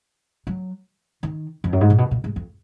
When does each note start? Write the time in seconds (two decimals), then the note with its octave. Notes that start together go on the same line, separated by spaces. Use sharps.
0.47 F#3
1.23 D#3
1.64 F2
1.73 F#2
1.81 G#2
1.90 A#2
1.98 B2
2.11 A#2
2.24 G#2
2.36 F2